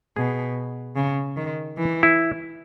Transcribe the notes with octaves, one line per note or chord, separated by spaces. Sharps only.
B2 G#4
C#3
D#3
E3
E4